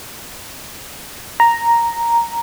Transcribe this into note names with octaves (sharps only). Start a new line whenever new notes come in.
A#5